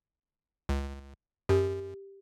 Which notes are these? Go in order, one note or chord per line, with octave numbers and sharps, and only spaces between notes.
C#2
F#2 G4